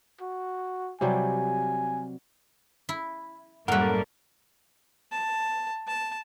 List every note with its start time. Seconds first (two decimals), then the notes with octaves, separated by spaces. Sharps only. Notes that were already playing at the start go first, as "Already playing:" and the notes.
0.21 F#4
1.01 C3 F#3 G3 G#5
2.89 E4
3.68 F#2 A2 G3 A3 A#3 A#4 F#5 F#6
5.12 A5
5.88 A5